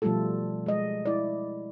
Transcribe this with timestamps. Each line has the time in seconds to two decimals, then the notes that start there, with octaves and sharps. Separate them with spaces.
0.02 B2 F3 G3 A3 F4 A4
0.66 G#3 D#5
1.06 E4 D5